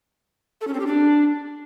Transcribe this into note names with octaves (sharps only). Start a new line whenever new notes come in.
A4
C#4
C4
G4
D4